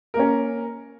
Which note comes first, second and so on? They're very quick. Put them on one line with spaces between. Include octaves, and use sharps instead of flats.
A#4 A#3 C#4